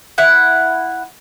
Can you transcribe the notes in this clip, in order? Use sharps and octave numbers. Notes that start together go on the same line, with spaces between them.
E4 F#5